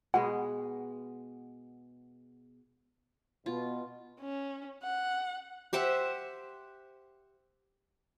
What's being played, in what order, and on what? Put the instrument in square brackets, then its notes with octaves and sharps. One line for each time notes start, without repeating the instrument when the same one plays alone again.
[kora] B2 G#3 B3 [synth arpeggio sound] F#5
[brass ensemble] B2 [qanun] F4
[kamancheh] C#4
F#5
[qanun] G4 C5 E5 F#5